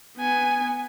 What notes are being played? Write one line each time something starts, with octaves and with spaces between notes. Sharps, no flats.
B3 G#5